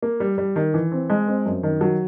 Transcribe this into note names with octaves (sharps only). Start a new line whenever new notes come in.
A#3
G3
G3
D#3
E3
C4
G#3
C4
F#2
D#3
F#3